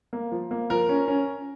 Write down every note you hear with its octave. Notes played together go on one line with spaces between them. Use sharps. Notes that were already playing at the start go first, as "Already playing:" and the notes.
A#3
F3
A#3
F3 A#4
C#4
C#4